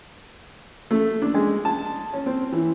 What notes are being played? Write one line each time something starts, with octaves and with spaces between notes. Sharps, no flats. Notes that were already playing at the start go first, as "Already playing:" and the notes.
A3
D4
G#3
A5
C#4
C4
E3